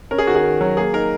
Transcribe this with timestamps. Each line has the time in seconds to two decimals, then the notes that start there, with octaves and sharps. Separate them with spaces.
0.11 C#4 A#4
0.18 G#4
0.27 D#3 F#4
0.35 G#4
0.44 D#3
0.61 F#3
0.77 A#3 G#4
0.93 D#4 A#4